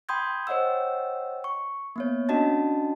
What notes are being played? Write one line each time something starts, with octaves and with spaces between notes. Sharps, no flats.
G5 B5 C6 D#6 G6 G#6
C5 C#5 D#5 F#5 G5 E6
C#6
A#3 B3 C#5
C#4 D4 F#4 D#5 A5 A6